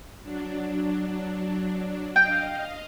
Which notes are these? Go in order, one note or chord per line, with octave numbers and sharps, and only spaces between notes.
F#3 D4
D#5 F5 G5